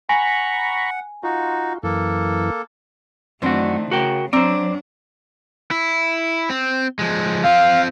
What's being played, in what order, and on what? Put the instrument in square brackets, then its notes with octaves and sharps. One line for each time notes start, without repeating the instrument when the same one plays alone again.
[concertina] F#5 [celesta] G#5 [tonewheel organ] A#5 B5 C#6
[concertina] D#4 F#4 [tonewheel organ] F4
[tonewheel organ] F#2 E3 [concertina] A#3 A4
[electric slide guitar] F#2 F#4 [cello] D#3 A3 [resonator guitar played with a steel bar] E3 C4 D4
[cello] C#3 [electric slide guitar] F#4 A#4 G5
[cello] F#3 D4 [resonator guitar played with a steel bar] C4 A#5 [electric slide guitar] C5 D5
[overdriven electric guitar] E4
C4
F3 G#3
[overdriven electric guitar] C4 F4 [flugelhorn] F5